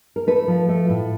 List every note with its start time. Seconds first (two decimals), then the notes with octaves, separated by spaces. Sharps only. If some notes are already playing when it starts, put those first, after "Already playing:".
0.16 A#4
0.27 A3 B4
0.48 F3
0.69 A3
0.90 A2